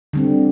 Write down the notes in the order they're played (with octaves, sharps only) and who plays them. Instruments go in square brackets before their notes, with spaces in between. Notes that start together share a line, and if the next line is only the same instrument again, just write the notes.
[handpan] D3 G3 C4